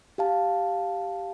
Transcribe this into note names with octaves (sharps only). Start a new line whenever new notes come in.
G4 F5 A5